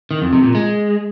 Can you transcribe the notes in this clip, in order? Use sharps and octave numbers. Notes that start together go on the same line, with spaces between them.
D#3
F2
C3
A#2
G#3